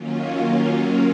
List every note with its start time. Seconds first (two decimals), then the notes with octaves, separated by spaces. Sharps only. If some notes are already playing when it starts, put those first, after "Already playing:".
Already playing: D#3 F#3 A#3 C#4 F4